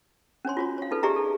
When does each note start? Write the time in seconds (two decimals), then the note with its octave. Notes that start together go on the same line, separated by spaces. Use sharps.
0.45 C#4 D4 C#5 C6
0.57 F4 F#4 C#5
0.78 C#5 F5
0.91 D#4 F4 A4 B4
1.03 D#4 G4 G#4 D5 E5 A#5
1.16 A4